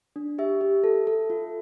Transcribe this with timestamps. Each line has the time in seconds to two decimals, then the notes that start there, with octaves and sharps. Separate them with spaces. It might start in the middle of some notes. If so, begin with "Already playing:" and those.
0.16 D4
0.38 G4 E5
0.61 G4
0.84 A4
1.07 A4
1.30 F4